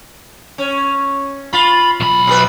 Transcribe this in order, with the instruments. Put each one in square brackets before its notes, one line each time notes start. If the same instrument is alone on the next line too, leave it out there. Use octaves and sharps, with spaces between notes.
[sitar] C#4
[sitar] F4 [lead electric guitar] B5
[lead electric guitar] B1 B5
[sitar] B2 G#4 B4